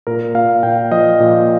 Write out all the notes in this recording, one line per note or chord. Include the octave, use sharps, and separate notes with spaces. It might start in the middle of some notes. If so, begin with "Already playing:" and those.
A#2 A#4
A#2 F5
A#2 G5
F3 D#5
A#2